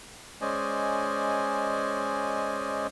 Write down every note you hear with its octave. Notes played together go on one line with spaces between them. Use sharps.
G#3 C#4 C5 D5 D#5 G#5